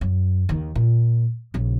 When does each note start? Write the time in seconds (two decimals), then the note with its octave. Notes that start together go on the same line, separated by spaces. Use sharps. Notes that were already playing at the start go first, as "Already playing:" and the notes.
0.01 F#2
0.49 D#2 D#3
0.76 A#2
1.54 A#1 C#3